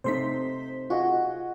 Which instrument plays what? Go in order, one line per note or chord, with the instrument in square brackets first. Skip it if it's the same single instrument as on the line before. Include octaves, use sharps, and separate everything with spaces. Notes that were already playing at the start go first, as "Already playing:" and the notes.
[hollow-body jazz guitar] C3 A3 D#4 [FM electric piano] C5 C6 B6
[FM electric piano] F4 [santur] F#4 G#4 D#5